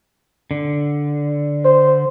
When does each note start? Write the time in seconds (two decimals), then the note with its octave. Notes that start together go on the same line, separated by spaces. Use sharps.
0.51 D3
1.65 C5